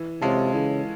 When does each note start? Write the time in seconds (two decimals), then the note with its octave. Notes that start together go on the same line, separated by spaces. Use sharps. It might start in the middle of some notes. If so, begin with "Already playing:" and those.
Already playing: E3
0.22 C3 G#3 C#4 F4 A4
0.53 C#3 E3